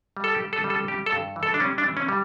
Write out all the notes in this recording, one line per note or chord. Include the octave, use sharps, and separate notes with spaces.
G3
A4
G4
G3
A4
G3
A4
G3 G4
A4
G2
E3
A4
D4
G3 C#4
D4
E3
C#4
G3